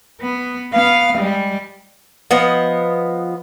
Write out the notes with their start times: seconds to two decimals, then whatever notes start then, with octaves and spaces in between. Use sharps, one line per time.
0.22 B3
0.73 B3 F5
1.18 G3 G#3
2.31 F3 B3 D#5